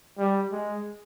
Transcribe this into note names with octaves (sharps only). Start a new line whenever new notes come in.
G3
G#3